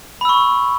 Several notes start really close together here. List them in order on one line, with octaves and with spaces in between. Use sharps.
B5 E6 C#6